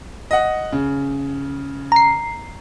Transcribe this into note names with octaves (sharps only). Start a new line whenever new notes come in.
D#5 F#5
C#3
A#5 C7